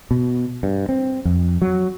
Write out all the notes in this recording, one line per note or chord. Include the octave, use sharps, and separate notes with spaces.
B2
G2
C4
F2
F#3